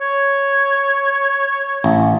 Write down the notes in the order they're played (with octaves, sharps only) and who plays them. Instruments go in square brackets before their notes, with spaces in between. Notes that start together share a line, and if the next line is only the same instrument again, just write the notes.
[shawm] C#5
[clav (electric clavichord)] A1